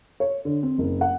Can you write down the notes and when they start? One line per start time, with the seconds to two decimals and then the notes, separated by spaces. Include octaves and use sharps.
0.20 C#5
0.45 D3
0.63 C4
0.78 F#1
1.01 F#5